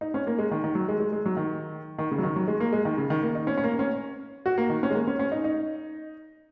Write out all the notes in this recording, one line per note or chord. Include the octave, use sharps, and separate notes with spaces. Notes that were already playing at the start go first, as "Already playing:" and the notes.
D#4
C#4
A#3
G#3
D#3
D#3
F#3
G#3
G#3
G#3
F#3
D#3
D#3
C#3
F#3
D#3
F#3
G#3
A#3
G#3
D#3
C#3
D#3
A#3
D#4
C#4
C#4
A#3
C#4
F#4
A#3
D#3
C#4
G#3
A#3
C#4
C#4
D#4
D#4